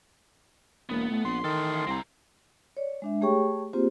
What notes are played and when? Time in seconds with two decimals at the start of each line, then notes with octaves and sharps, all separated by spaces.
0.89 E1 A#3 B3
1.11 A2 A3
1.25 A#1 C6
1.44 D#3 E3 A4
1.87 C2 C4 A#5
2.77 C#5 D5
3.02 G#3 D4 E5
3.21 A3 G4 G#4 C#5 G5 C#6
3.73 A#3 C4 F4 G4 G#4 C5